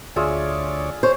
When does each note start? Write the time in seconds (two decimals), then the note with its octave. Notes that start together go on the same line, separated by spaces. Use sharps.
0.16 D2 F4 G#4 C#5 D5 E5
1.03 C5 C#5